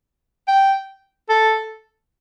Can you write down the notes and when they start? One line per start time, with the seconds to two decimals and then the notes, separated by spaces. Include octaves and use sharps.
0.48 G5
1.29 A4